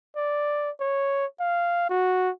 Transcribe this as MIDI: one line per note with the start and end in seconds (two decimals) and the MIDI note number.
0.16 0.70 74
0.80 1.26 73
1.40 1.88 77
1.89 2.30 66